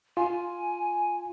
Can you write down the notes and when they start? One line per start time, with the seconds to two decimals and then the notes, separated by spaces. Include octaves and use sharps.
0.17 F4 G#5